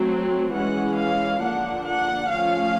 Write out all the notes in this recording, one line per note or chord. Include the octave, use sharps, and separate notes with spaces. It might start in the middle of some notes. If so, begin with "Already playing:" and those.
Already playing: F#3 A3 C4
E3 G#3 C#4 F#5
F5
D3 F3 A#3 D4 F#5
F#5
F3 A3 C#4 F5